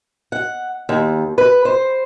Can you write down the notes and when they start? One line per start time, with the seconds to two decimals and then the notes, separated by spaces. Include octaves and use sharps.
0.32 F#5
0.89 D#2
1.38 B4
1.65 C5